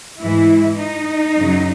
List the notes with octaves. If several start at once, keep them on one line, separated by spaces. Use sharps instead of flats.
G#2 E3 G#3 E4
D#4
F#2 C#3 F#3